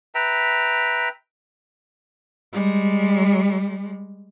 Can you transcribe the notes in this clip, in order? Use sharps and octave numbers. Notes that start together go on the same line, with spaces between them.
B4 E5 G5 A#5
G3 G#3